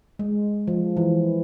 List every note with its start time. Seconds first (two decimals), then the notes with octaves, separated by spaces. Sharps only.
0.19 G#3
0.68 F3
0.97 E3